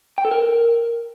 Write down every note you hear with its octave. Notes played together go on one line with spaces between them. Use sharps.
G5
A4
A#4